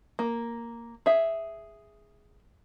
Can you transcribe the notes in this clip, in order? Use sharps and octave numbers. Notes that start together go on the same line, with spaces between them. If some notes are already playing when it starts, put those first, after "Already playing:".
A#3
G#4 E5